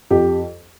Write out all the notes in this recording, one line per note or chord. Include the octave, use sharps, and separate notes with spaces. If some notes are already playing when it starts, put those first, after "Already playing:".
F2 G4